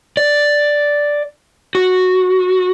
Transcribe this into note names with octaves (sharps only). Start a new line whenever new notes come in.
D5
F#4